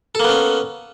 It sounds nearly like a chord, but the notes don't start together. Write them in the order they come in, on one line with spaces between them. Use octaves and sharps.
A4 A#3 B3 C#4